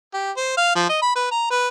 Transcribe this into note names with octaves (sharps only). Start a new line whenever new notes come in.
G4
C5
F5
F3
D#5
B5
B4
A#5
B4